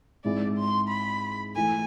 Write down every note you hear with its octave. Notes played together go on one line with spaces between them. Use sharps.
G#2 G#3 C4 E4 G#4 D5
C6
B5
E3 A3 E4 G#5